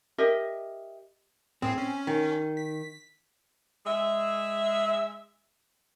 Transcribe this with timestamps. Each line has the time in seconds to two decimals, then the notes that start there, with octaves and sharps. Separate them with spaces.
0.18 G4 A#4 D#5 E5
1.62 A2 C4 G#4
1.78 C#4
2.07 D#3
2.57 B6
3.85 G#3 E5